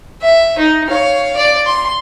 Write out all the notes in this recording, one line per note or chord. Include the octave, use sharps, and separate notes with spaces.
E5
D#4
C#5 F5
D5
C6